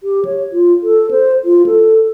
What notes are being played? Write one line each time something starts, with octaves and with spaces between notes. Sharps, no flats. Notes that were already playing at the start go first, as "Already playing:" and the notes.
G4
C#5
F4
A4
C5
F4
A4